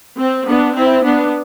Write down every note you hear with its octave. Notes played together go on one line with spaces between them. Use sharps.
C4
B3 D4
C4 E4
B3 D4